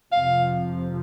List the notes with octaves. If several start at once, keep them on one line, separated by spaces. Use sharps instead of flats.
F2 C3 F3 F5